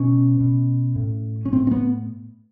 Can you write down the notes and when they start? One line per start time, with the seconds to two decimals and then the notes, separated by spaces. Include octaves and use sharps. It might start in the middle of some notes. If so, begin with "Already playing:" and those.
Already playing: B2 C#4
0.40 B2
0.96 A2
1.45 C#4
1.52 A2 C4
1.67 C4
1.71 B3